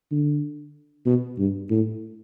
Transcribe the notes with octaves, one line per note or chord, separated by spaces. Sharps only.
D3
B2
G2
A2